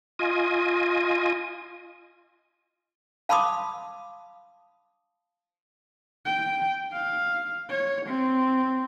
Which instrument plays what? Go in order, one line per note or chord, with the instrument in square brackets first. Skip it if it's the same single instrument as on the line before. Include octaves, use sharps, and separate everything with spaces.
[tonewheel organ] F4 D#5 G#5
[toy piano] F5 A5 B5 C6 D6 D#6
[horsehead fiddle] G5
F5
C#5
C4